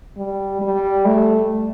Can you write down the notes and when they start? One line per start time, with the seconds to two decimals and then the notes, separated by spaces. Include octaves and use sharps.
0.17 G3
0.62 G3
1.05 A3